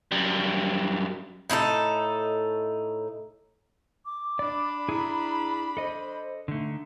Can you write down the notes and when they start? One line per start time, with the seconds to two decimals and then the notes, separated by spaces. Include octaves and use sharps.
0.12 F#2 G3
1.50 A2 D#4 E4 A4
4.06 D6
4.39 D4 D5 B5
4.89 E4 G#4 A#5
5.77 A4 C5 D#5
6.48 D3 A3 D#4